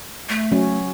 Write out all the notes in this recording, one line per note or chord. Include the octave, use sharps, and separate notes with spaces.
A3
F#3 C#4